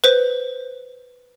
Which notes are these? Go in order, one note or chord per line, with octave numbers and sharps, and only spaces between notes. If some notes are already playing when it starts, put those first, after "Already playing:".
B4 C5